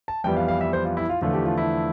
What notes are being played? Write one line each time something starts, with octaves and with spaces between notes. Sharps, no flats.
A5
F2 E3 G3 B3 G5
F5
F5
E5
C5
F4
E4
F4
E2 D3 F3 A3 F4
G4
F4
E4